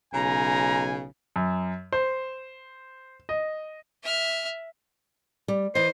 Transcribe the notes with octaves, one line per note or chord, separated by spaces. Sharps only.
B1 C#3 G#5 A#5
F#2
C5
D#5
E5 F6
G3
E3 C5 D#5